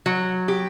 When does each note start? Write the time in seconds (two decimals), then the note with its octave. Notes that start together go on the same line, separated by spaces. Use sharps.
0.06 F#3
0.48 G4